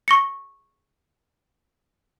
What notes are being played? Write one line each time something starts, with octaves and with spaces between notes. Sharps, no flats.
C#6 A#6 C#7